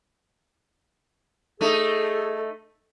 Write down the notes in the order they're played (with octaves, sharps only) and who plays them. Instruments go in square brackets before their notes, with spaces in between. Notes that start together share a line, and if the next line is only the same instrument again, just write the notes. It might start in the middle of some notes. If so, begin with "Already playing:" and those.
[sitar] A3 D#4 [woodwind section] G#4 A4